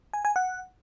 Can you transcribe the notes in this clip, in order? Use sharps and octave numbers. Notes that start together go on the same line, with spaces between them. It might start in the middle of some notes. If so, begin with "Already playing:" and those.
G#5
G#5
F#5